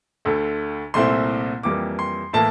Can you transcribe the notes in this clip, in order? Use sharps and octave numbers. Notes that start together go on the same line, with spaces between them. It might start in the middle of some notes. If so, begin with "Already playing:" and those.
D2 D3 A3
C2 A#2 A3 C4 E4 C6
F2 E3 G3 A#3 D6
C6
A2 E3 A#3 E4 A5